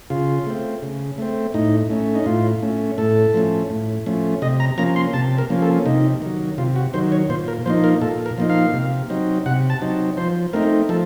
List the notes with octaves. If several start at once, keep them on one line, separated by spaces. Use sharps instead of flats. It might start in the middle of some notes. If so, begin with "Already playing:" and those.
C#3 F4
A3 C4
C#3
A3 C4
A2 D#4
A3 C#4
D#4
A2 F4
A3 C#4
A2 A4
F3 A3 C#4
A2
F3 A3 C#4
C3 D#5
A#5
F3 A#3 C#4 A#5
C6
C3 A5
A#4
F3 A#3 C#4
A4
C3 D#4
D#3 F#3
C3 F4
F#4
D#3 F#3 C5
C#5
A#2 C5
A#4
F3 A#3 D#4 C5
A#4
A#2 A4
A#4
F3 A#3 D#4
F5
C3
F#3 C4 D#4
C3 F#5
A5
F#3 C4 D#4
F3 C5
A3 C4 D#4 A#4
F3 A4